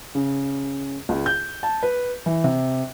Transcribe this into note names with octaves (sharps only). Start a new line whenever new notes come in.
C#3
C#2
G6
A5
B4
E3
C3